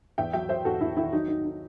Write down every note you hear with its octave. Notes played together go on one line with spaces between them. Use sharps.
E2 E5 G5
F#3 E5 G5
F#3 C5 E5
E2 F#4 A4
E2 E4
D#3 E4
F#3 D#4
D#4
D#4